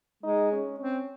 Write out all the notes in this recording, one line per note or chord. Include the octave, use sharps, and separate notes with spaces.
G#3 D#4
C#4
C4 C#4